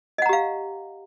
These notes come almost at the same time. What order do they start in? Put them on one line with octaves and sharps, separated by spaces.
D#5 F#5 A#5 G4 F5